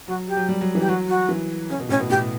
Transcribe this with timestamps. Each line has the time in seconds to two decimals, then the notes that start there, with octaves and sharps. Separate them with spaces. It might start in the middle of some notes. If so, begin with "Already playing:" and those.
0.08 F#3 F#4
0.28 G4
0.37 F#3
0.49 G3
0.61 F#3
0.75 E3
0.80 G4
0.88 F#3 F#4
1.08 F#4
1.29 E3
1.69 C#3 C#4
1.79 B2
1.89 A2 C#4
2.00 B2
2.10 A2 G4